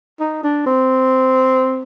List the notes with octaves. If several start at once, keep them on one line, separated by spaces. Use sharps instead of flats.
D#4
D4
C4